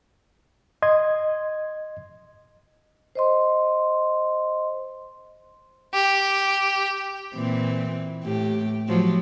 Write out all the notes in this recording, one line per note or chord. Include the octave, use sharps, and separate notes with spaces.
D#5 C6 G#6
C5 D#5 C6
G4
A#2 E3 C4
A2 G4
A2 F3 F#3